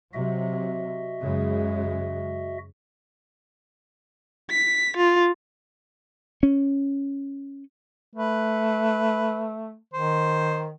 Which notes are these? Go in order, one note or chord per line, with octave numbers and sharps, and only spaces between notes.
C3 F#3 F#4 D#5 E5
F#2 C#3 G#3
B6
F4
C#4
A3 B4
D#3 C5